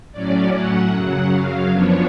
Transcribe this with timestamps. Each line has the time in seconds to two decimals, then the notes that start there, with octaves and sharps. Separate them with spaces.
0.12 A2 F#3 C#4 D5
0.53 F#5
0.92 F#2 C#3 F#3 F#5
1.31 F5
1.71 F#2 F3 B3 D4 C#5